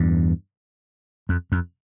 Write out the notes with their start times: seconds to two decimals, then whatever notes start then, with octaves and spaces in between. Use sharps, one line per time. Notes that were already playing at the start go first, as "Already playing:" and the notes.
Already playing: E2 G2
1.29 F2
1.52 F2